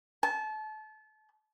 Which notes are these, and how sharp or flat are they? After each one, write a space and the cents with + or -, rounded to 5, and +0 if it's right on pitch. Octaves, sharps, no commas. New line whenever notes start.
A5 -30